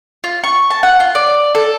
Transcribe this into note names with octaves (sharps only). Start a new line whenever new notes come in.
F4
C#6
A5
F#5
F4
D5
A4